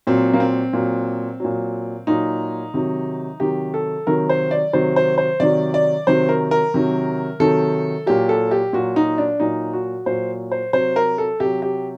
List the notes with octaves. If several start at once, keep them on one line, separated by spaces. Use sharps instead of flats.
A#2 F#3 C4
A#3
C4
A#2 F#3
A#2 F#3
A#2 F#3 D#4
C3 D#3 F#3
C3 D#3 F#3 G4
A4
C3 D#3 F#3 A#4
C5
D5
C3 D#3 F#3 C5
C5
C5
C3 D#3 F#3 D5
D5
C3 D#3 F#3 C5
A#4
A#4
C3 D#3 F#3
C3 D#3 F#3 A4
A#2 F#3 G4
A4
G4
A#2 F#3 F#4
D#4
D4
A#2 F#3 D#4
F#4
A#2 F#3 C5
C5
C3 F#3 C5
A#4
A4
C3 F#3 G4
G4